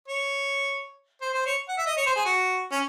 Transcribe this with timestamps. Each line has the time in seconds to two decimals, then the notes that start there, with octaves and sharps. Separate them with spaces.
0.08 C#5
1.21 C5
1.34 C5
1.46 C#5
1.68 F#5
1.78 E5
1.86 D#5
1.97 C#5
2.06 C5
2.16 G#4
2.25 F#4
2.72 C#4